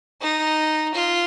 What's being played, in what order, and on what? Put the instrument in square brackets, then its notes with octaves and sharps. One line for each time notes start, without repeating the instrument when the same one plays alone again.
[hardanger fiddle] D#4
F4